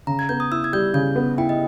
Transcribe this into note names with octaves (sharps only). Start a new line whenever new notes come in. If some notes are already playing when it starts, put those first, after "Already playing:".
C#3 A#5
G#6
B3 G6
D#6
E4 E6
G#6
G3 G6
C#3 G6
B3
E4 G5
D#5